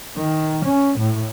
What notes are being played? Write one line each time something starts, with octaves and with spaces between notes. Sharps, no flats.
D#3
C#4
A2